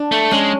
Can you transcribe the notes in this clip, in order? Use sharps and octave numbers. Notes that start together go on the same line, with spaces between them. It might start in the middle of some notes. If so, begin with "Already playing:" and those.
Already playing: D4
A3
G#3 C#4